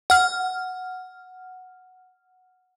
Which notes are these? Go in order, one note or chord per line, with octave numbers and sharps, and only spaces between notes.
F#5 F6